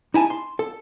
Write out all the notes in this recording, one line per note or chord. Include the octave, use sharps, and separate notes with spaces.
D#4 E4 G#5 A5
C6
A4